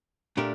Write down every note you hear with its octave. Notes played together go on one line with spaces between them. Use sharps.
A#2 A3 D4 G4 A#4